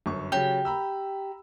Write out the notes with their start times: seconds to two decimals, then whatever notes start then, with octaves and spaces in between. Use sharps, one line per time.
0.06 G1 F#2 C#6
0.32 C#3 F#3 G4
0.65 A#5 B5 E6